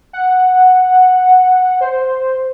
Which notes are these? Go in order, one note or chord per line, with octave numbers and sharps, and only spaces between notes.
F#5
C5